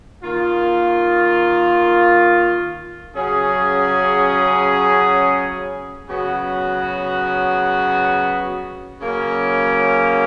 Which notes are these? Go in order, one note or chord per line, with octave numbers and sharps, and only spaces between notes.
D#3 A#3 F4
C#3 F#3 C#4 G#4
C#3 F#3 B3 F#4
C#3 F#3 A#3 C#4